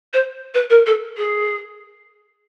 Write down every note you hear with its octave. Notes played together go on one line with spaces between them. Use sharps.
C5
B4
A#4
A4
G#4